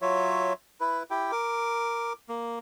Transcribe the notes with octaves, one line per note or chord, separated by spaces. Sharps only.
F#3 F4 C#5 E5
E4 B4
E4 G4 G5
A#4 D6
A#3